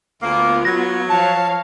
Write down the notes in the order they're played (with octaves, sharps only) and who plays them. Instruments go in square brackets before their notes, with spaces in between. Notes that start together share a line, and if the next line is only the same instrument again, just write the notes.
[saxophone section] D2 A#3 [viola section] B3 F4
[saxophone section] F#3 [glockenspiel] A#6
[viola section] F3 C#5 F5 [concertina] A5